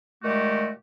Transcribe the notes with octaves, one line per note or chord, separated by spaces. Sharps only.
A#2 D#3 G#3 A3 F#4 G4